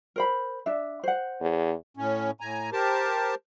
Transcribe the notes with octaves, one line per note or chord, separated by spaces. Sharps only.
A#4 C5 B5
D4 E5
C5 F#5
E2
A2 C#4
A2 G#5 A#5
G4 A#4 C5 A5